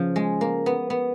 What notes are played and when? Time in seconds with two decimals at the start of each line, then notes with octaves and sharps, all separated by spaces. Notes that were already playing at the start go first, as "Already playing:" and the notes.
Already playing: C#3 F3
0.16 G#3
0.41 A#3
0.66 B3
0.90 B3